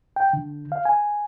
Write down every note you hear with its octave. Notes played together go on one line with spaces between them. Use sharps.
G5
D3
F5
G#5